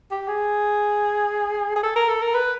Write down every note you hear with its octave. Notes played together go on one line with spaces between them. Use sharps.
G4
G#4
G#4
A4
A#4
A4
A#4
B4